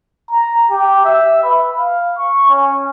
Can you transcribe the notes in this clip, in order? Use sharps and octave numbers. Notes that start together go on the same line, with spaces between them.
A#5
G4
E5
B4
F5
C#6
C#4